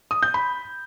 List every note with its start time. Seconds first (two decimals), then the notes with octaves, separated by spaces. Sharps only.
0.11 D#6
0.23 G6
0.34 B5